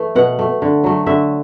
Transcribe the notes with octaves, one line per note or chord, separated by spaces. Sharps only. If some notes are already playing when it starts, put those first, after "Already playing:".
Already playing: E3 A3
B2 F#5
A3
D3
F#3 A3
D3 E5